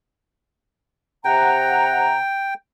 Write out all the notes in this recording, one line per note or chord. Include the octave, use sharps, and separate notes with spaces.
C3 F#5 G5 A#5